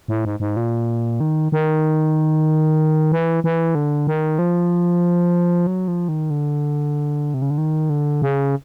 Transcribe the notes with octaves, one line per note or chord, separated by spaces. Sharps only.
A2
G#2
G#2
A#2
D#3
D#3
E3
E3
D3
D#3
F3
F#3
F3
D#3
D3
C3
C#3
D3
D#3
D3
C#3